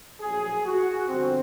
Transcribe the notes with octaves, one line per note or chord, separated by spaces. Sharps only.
A#1 A2 F#3 G#4
F#4
G1 F2 D3 C4